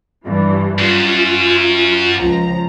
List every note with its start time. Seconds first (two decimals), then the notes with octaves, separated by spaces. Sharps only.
0.24 G2 E3
0.79 F#2 F4
2.17 C#2 F3 A#5